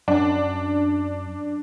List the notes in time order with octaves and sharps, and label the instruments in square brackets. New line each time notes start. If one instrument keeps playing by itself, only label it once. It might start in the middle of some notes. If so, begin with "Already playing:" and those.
[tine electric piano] F#2 [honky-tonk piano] D4